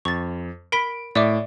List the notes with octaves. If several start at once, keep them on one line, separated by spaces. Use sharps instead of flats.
F2 C#6 A6
A#4 B5 B6 D7
A2 D5 E5 D6